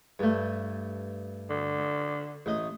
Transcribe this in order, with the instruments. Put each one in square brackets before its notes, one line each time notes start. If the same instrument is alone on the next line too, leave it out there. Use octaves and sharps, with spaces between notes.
[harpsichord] G2 A3
[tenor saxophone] D3
[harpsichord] A1 D#5 D#6